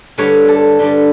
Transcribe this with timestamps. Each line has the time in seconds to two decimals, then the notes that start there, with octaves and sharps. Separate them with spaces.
0.18 G2 D3 G3 C#5
0.49 A4
0.79 G2 D3 G3